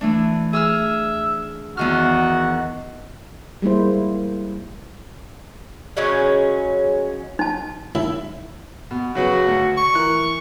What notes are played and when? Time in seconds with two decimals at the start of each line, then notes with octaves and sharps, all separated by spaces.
0.01 E3 A3 D4
0.53 G#4 E5 E6 F6
1.77 E2 D#3 F#4 F6
3.62 G3 G#3 A#3 E4 C5
5.97 C#3 F#3 G#3 C#4
7.39 D#4 A5
7.95 D#2 E4
8.91 B2
9.15 C#3 F#3 F#4 B4
9.47 D2
9.77 C#6
9.94 E3 A#4 F#6